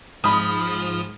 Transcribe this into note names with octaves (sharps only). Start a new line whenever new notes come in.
G#2 F3 B5 D#6